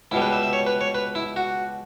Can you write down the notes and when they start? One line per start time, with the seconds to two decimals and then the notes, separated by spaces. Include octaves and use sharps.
0.11 C#2 B2 G3 E4
0.22 B4
0.33 E5
0.43 E5
0.53 C#5
0.67 B4
0.81 C#5
0.95 B4
1.15 E4
1.36 F#4